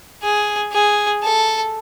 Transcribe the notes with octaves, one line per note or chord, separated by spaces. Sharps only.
G#4
G#4
A4